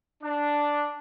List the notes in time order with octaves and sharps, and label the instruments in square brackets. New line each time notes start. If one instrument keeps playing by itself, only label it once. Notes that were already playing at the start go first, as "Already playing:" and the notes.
[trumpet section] D4